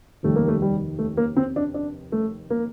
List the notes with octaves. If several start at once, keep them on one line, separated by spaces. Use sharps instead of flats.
F1 D#2 D#3 G3 A3
A#3
A3
G3
A3
A#3
C4
D4
D4
A3
A#3